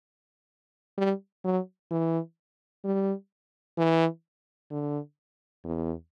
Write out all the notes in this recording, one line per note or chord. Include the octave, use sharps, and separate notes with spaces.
G3
F#3
E3
G3
E3
D3
E2